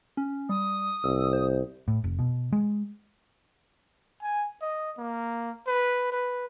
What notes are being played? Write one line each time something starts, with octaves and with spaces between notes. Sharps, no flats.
C#4
G3 D#6
C2 E6
C5
A2
F1
B2
G#3
G#5
D#5
A#3
B4
B4